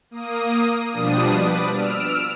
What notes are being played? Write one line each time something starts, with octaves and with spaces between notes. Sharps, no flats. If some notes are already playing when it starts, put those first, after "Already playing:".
A#3 D#6
B2 F3 G3 D4 D#6
B4 D5
E6 F6 D7